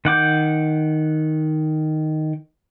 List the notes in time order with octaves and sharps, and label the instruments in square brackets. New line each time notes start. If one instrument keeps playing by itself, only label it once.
[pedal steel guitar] D#3 F#5 D6 G6